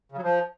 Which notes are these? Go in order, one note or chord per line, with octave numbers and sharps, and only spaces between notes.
C#3
F#3
F3